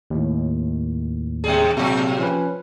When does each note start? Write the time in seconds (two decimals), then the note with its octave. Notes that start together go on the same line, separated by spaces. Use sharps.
0.10 D#2 A2
1.44 B2 G3 G#4
1.77 A2 C3 F#3 G4
2.19 F3 C#4 B4